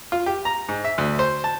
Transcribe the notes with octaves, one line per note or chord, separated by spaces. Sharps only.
F4
G4
A#5
G#2
E5
D2
C5
A5